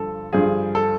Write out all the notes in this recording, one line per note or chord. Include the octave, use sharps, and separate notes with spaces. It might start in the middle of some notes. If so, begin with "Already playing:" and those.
Already playing: G2 D3 F3 A4
G2 D3 F3 G#4
A4